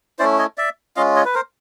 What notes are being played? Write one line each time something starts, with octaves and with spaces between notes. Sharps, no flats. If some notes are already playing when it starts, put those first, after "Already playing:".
A3 C#4 E4 C5 D5
C#5 D#5
D5 E5
G#3 C#4 F4 D#5 F5
C#5 D#5
B4
A#4 C5